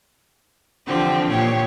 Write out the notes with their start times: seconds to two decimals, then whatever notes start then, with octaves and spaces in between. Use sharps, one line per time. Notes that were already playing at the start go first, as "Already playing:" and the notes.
0.88 D3 E3 F3 C4 G4
1.30 A#2 G4 C#5